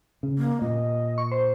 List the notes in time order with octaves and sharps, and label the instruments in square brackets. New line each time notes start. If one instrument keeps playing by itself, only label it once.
[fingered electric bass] C#3
[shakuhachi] A#3
[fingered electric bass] A#2 [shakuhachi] D#5
[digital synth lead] C#6
C5